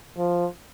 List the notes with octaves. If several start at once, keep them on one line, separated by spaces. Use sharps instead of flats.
F3